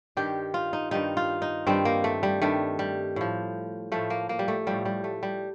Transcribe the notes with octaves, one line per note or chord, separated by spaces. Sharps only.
G2 D#3 G3 G4
F4
D#4
G2 D#3 G3 D#4
F4
D#4
G2 D#3 G3 C4
A#3
A3
G3
G2 D#3 G3 A3
G3
A2 F3
A2 F3 A3
A#3
A#3
G3
A3
A2 F3 G3
G3
A3
G3